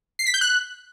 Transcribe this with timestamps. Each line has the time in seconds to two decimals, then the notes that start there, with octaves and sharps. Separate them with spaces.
0.19 C7
0.26 B6
0.34 G6
0.41 F#6